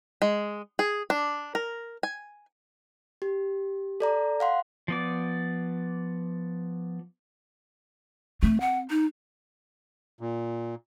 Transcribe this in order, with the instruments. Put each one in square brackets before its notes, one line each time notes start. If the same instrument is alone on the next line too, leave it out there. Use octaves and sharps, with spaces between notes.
[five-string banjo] G#3
G#4
D4
A#4
G#5
[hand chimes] G4
A4 D5 A#5
F5 F#5 C6
[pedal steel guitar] F3 B3 D5
[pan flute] A3 [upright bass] C4
[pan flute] F#5
D#4
[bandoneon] A#2